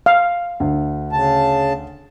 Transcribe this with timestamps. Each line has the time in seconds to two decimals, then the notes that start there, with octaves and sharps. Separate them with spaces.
0.06 F5
0.60 D2
1.12 C#3 A5